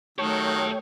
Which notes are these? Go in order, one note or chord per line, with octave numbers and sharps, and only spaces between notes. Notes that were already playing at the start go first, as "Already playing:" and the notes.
D#3 F#3 A3 G4 C#5 G5 A5 C#6